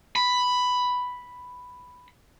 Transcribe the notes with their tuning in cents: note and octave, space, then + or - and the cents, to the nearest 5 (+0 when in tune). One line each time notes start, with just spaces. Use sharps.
B5 +5